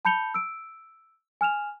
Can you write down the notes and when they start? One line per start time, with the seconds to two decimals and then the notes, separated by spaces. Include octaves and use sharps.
0.05 A5 B5 G6 C#7 F7 G7
0.34 E6 D7
1.41 G#5 F6 E7 F7